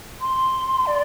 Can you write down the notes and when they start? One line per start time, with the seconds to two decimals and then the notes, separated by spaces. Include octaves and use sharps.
0.21 C6
0.86 D5